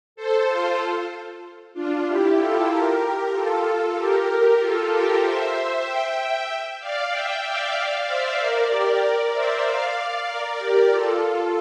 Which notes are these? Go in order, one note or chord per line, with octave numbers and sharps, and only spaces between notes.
A4 C5
F4 A4
D4 F4
E4 G4
F4 A4
G4 A#4
F4 A4
G4 A#4
G4 A#4
F4 A4
G4 A#4
C5 E5
E5 G5
D5 F5
E5 G5
D5 F5
C5 E5
A#4 D5
G4 A#4
A#4 D5
C5 E5
D5 F5
A#4 D5
G4 A#4
F4 A4